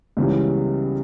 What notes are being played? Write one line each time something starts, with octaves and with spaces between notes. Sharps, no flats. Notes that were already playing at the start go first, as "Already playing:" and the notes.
C#2 C#3 E3 G3 B3